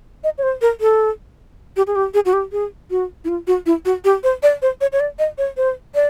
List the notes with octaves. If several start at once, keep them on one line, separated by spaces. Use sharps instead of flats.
D#5
C#5
C5
A#4
A4
G4
G#4
G4
G#4
F#4
G4
G#4
F#4
E4
F4
F#4
E4
F#4
G4
C5
D5
C5
C#5
C#5
D5
D#5
C#5
C5
D5